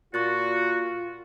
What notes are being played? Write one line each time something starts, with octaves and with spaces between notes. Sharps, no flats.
A#2 F4 F#4 C#6 F#6 A6